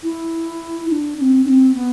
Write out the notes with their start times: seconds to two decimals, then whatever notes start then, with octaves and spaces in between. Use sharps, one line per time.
0.03 E4
0.88 E4
0.92 D4
1.17 D4
1.21 C4
1.45 D4
1.48 C4
1.74 B3